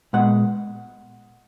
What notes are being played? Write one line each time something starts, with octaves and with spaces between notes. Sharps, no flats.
A#2 G#3 B3 F#5